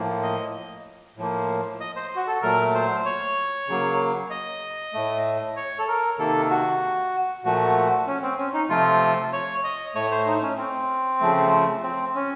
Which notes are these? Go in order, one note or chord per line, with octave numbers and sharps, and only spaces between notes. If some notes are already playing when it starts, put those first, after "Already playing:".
Already playing: A2 F3 A#3
D#5
A2 F3 A#3
D#5
C5
F#4
A4
A#2 F#3 A3 A#4
C5
C#5
C#3 F#3 A#3
D#5
A2 A3
C#5
A4
A#4
C3 D#3 A#3 A4
F#4
A#2 F3 A3 F#4
C#4
C4
C#4
D#4
C3 F3 A3 F4
C#5
D#5
A2 A3 C#5
C5
D#4
C#4
C4
C#3 F3 A3
C4
C#4